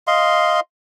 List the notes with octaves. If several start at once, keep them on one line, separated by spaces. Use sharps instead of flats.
D#5 F5 C6